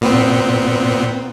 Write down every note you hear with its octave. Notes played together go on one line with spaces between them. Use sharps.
A#2 B3 C4